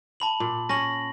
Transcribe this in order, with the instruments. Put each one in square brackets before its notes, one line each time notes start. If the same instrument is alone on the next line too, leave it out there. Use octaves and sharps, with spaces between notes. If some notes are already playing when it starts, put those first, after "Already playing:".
[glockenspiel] A5 B5 F#7
[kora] A#2
[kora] C#4 [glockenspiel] A#6 F#7